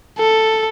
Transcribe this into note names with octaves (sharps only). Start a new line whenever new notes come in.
A4